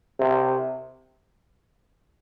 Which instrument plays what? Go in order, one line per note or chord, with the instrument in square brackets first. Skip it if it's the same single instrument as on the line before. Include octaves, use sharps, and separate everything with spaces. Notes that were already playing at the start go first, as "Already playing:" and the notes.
[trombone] C3